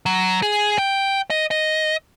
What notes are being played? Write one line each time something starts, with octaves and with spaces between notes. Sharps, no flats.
F#3
G#4
G5
D#5
D#5